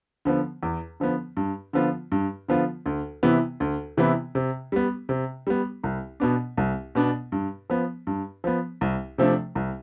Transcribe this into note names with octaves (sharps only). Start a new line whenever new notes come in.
D3 F3 B3
E2
D3 F3 B3
G2
D3 F3 B3 F4
G2
D3 F3 B3 F4
D2
C3 E3 B3 E4
D2
C3 E3 B3 E4
C3
G3 B3
C3
G3 B3
C2
B2 B3 D4
C2
B2 B3 D4
G2
F3 B3
G2
F3 B3
C2
C3 F3 A3 D4
C2